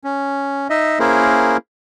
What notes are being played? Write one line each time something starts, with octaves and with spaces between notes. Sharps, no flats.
C#4
D#4 D#5 E5
A#3 C#4 E4 G#4 A#4 C5